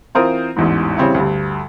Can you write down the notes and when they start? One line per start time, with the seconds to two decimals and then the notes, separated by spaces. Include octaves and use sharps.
0.15 E3 C4 F4 A#4 C5 D#6
0.56 A1 E2 G#2
0.97 C#3 E3 G3 C4 C#5
1.14 D2 G2